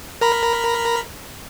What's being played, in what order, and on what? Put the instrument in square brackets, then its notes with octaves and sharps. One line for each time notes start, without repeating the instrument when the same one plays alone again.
[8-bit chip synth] A#4 A#5 B5